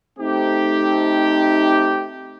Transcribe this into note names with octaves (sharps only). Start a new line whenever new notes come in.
A3 C4 D#4 G4